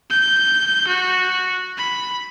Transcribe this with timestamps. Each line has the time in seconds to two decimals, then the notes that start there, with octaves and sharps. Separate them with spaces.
0.10 G6
0.88 F#4
1.78 B5